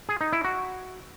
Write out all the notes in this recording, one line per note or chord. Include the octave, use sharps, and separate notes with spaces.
G#4
D#4
E4
F#4